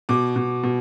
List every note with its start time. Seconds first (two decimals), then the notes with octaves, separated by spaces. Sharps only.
0.09 B2 D6
0.36 B2
0.63 B2